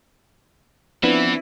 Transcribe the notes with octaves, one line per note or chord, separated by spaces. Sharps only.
E3 F3 B3 C4 D4 E4 B4